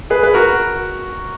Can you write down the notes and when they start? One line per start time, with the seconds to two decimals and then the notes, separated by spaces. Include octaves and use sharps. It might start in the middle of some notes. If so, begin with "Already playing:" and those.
0.10 G#4 B4
0.23 B4
0.34 F#4 A#4